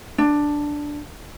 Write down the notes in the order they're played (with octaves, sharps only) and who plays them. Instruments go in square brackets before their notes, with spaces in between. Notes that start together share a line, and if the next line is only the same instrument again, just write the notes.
[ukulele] D4